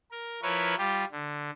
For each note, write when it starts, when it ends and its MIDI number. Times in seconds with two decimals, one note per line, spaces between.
0.11 0.40 70
0.42 0.75 53
0.42 0.75 64
0.42 0.75 70
0.42 0.75 71
0.42 0.75 73
0.78 1.05 55
0.78 1.05 65
0.78 1.05 67
1.12 1.50 50